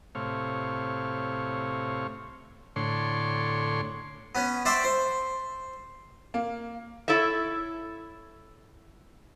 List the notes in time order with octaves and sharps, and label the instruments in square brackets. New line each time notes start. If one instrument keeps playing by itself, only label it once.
[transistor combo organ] A2 C3 C#5 F5
A2 D3 C#5 C6
[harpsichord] B3 C#4
C5 D5 E5 G5 C#6
C5
[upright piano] A#3
[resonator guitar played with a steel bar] E4 A4 C#5 E5